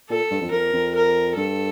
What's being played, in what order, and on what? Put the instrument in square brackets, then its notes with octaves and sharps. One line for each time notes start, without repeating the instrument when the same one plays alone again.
[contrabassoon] A#2 [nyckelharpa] A4
[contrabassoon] G2
F2
[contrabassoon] F2 [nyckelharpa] A#4
[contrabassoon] F2
[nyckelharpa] A#4
[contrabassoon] G2 [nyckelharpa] A4